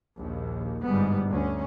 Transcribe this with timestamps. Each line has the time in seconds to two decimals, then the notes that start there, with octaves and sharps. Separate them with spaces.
0.17 A#1 D#2
0.86 G1 G#2 G3 B3
1.28 D2 C#4